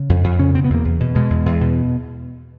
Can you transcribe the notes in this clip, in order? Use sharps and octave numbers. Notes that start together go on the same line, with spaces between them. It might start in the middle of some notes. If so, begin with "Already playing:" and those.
Already playing: C#3
F2
F2
C#3 C#4
B2 C4
B3
E2 A#3
E2
B2
B2 G#3
E2
E2
B2